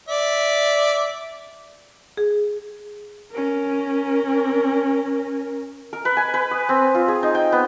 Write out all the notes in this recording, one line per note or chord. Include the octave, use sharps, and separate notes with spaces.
D5 E5
G#4
C#4 A#4
A#4
B4
G#5
B4
D#6
C4
F4
G#4
D#4
G5
B3